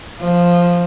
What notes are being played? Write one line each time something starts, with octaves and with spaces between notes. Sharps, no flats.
F3